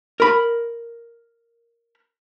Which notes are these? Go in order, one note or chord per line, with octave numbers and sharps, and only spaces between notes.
A#4 B5